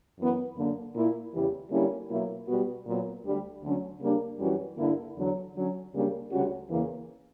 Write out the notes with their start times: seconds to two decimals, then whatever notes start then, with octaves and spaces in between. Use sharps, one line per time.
0.18 F#2 E3 B3
0.57 F#2 D3 A#3
0.94 A#2 A#3 E4
1.33 E2 C#3 E3 G3
1.71 D3 G3 A#3 C#4 E4
2.09 B2 F#3 A#3 E4
2.48 B2 G3 B3 F#4
2.86 A#2 F#3 B3
3.24 D2 D3 G3
3.63 D2 D3 F#3 C#4
4.00 C#3 G3 A#3 D4
4.39 F#2 E3 G3 C#4 F#4
4.77 G2 D3 A#3 E4
5.15 E2 D3 F#3
5.54 D3 F#3 C#4
5.92 D2 C#3 G3 A#3 D4
6.30 D2 C#3 G3 C#4 F#4
6.69 E2 C#3 E3 A#3